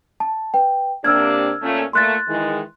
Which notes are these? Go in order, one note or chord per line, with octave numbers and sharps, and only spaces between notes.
A5
B4 G5
C3 A#3 D4 E6 F6 G#6
A#2 A3 C#4
A#2 A3 C6 F#6 A6
D#3 E3 G#3